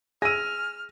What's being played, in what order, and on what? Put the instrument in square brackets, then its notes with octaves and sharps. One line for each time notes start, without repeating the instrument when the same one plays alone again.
[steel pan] G#4 [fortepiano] G#5 E6 [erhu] F6 [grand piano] A#6 D#7